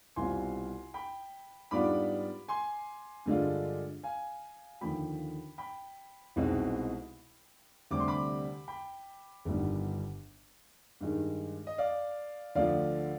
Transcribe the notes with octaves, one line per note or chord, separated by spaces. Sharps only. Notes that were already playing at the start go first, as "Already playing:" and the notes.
C2 B2 G3 C4 F4 G#5 C6
G5 B5
G#2 G3 B3 D4 F4 B5 D6
G#5 C6
G2 D3 G#3 D4 F4
F5 G#5
D#2 D3 F3 G5 B5
G5 B5
C2 B2 G#3 C4 D#4
D2 C3 G3 D4 D6
C6
B5 D6
G5 B5
G1 G2 D#3 G3 B3
G2 D#3 G#3
D#5
D5 F5
D2 D3 F3 D5 F5